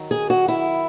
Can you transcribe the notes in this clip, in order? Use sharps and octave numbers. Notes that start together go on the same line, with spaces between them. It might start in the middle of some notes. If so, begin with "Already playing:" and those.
Already playing: D#3 F#3
G#4
F#4
E4